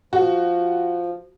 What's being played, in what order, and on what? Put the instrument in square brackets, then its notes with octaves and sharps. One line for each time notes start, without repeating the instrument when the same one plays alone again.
[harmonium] F3 [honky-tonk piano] F#4